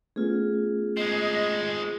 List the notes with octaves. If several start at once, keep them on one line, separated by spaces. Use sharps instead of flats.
A3 B3 C#4 F4 G#4
G#3 C4 D#5